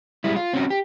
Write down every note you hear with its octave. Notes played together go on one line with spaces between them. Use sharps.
G3 G#3 E4
F4
C4 C#4 F#4
G4